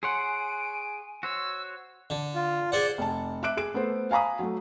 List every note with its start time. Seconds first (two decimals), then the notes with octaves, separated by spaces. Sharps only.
0.03 G#4 C#5 F#5 G#5 C6 C#7 D7
1.23 F#4 C5 C#5 E6
2.10 D3
2.35 F4
2.72 G#4 C5 D5 F#5
2.98 F1 A5
3.43 E5 D6 F#6 D7
3.57 G#4 D7
3.74 A3 B3 A4 C5
4.11 F5 G#5 A#5 B5 D#6
4.39 F#3 A3